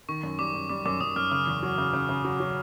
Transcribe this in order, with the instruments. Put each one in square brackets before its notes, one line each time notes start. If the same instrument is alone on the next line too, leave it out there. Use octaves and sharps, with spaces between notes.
[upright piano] D#3 [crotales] C#6
[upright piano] F#2
[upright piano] G3 [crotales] D6
[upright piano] F#2
[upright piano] G3 [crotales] D6
[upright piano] F#2 [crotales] D6
[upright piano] F#2 [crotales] D#6
[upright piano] F#2 [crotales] F6
[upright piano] C#3 [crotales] F6
[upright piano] E2
F#3
C#3
C#3
C#3
F#3
F#3